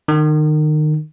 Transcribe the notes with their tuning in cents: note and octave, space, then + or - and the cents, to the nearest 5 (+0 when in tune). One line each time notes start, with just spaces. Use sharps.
D#3 -30